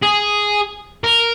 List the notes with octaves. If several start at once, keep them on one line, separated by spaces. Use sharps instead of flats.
G#4
A#4